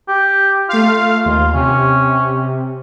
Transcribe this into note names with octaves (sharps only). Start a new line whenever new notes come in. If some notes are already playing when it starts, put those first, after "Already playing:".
G4
A3 F4 F5
D#2 F4
C3 C#4